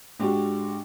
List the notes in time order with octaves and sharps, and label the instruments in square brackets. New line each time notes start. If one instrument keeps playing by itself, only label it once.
[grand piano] G#2 G#3 D4 F#4 G4